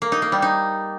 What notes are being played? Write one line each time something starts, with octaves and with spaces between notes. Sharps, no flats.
A#3
D#4
A#3
G3
D#4